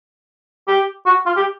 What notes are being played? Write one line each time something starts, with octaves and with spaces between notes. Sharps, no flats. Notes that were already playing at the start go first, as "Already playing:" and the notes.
G4
F#4
F4
G4